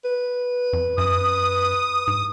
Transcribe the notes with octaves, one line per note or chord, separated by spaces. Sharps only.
B4
F2
F#2 D#6
G#2